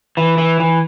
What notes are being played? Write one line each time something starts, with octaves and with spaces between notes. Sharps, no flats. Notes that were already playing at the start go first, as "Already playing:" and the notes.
E3
E3
E3